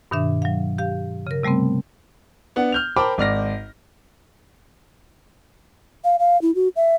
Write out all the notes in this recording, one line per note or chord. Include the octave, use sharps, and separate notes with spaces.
G2 B2 D#3 D4 E5
F#3 F5
G4 F5
C#3 A#4
C3 G3 A3 B3 C4
B3 D4 F#5
F6 G6 F7
A#4 C5 G5 A5 B5 D6
G#1 D5 F6 A#6
F5
F5
E4
F#4
E5